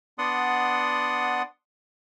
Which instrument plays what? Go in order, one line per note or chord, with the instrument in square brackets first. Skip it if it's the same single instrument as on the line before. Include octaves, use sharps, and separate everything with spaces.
[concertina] B3 D4 D5 F#5 C6 D#6